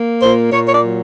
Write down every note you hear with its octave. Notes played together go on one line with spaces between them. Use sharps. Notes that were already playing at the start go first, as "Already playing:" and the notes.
Already playing: A#3
A#2 C5
A#2 C#5
C#5
D5
F#3